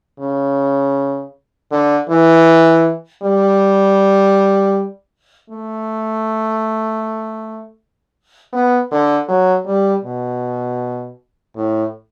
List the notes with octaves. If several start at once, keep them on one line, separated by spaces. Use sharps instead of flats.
C#3
D3
E3
G3
A3
B3
D3
F#3
G3
B2
A2